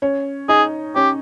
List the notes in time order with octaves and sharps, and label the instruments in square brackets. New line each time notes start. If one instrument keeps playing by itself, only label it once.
[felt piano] C#4 C#5
[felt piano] D#4 D#5 [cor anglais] G#4
[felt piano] C#4 C#5 [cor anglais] G4